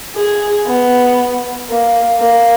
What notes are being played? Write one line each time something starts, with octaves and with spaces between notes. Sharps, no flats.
G#4
B3
A#3
A#3